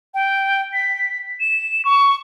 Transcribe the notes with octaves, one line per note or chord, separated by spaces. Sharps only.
G5
B6
E7
C#6